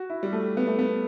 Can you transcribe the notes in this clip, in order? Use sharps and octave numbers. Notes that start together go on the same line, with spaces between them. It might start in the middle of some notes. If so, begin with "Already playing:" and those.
Already playing: F#4
E4
G3
A3
B3
A3
B3